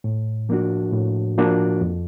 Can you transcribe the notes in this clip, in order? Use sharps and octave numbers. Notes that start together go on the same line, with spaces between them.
A2
F3 A#3 D4 F#4
A2
F3 A#3 D4 F#4
F2